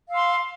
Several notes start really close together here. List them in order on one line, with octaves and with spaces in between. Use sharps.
F5 E6 C6